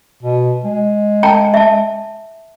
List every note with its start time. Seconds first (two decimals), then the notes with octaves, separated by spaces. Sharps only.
0.23 B2
0.64 G#3
1.23 G5 A5 A#5
1.54 E5 A5